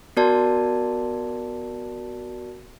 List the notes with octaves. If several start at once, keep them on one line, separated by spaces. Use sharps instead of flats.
B3 F#4 A#4 D5 A5